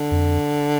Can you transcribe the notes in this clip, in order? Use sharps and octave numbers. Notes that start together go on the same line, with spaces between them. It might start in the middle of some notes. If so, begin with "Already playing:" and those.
Already playing: D3
F2